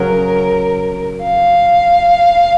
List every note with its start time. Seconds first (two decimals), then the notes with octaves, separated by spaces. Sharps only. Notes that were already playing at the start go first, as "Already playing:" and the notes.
Already playing: C#3 F#3 C#4 A#4
1.23 F5